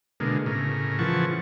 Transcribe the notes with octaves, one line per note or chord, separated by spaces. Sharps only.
B2 D3 G#3 A#3
A2 C#3 A#4
C#3 E3 F3 F#5 A5 C#6